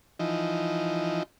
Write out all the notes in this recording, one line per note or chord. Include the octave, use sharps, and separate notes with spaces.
E3 F3 D#4